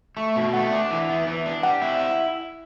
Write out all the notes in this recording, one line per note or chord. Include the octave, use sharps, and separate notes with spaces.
A3 C#6
B2
A3 F#5
D4
E3
B3
E3
D4
G3 F#5
E4